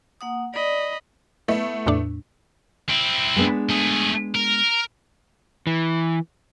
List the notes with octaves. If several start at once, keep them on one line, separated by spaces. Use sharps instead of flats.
A#3 F#5 D#6
D5 D#5 B5
A3 B3 E4
E2 A2 D4
C4 E4
G#3 B3 D4
A3 G#4
A#4
E3